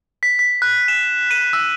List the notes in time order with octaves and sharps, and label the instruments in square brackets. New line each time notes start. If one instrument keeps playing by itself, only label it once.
[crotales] B6
B6
F#6
E7
D#7
E6